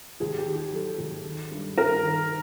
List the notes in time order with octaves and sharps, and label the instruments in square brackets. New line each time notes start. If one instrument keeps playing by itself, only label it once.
[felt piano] D#2 G#4
G4
D#3
G4
F#3 A4
D#2
D#3
G2
G2 A#4
D#3